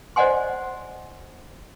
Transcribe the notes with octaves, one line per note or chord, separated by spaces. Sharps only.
C5 D5 D#5 F#5 G#5 C6